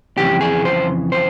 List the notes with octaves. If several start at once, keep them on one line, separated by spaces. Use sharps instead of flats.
F2 C#3 E3 G4
G#4
C5
C5